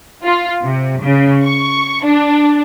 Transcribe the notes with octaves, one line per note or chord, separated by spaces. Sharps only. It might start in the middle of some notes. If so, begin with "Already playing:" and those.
F4
C3
C#3
C#6
D4